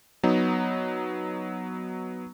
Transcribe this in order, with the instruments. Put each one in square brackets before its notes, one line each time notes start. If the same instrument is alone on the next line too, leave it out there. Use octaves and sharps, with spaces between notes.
[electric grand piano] F#3 B3 D#4